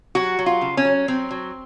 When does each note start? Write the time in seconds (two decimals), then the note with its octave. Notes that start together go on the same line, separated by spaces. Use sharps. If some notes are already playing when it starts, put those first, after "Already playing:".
0.15 F#3 F#4
0.39 F#3
0.46 F4
0.61 C#3
0.77 C#4
0.85 F#3
1.08 F#3 C4
1.31 F#3